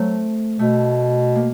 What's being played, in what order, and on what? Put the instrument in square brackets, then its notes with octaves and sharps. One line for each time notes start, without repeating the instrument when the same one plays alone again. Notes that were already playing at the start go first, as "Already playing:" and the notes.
Already playing: [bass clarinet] F#3 [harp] A3 C4
[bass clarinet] B2 [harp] A3
[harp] A#3